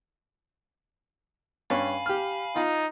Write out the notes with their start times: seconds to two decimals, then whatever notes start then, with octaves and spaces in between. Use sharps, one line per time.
1.70 G2 C#4 F5 G#5 B5
2.06 G4 F6
2.56 D#4 F4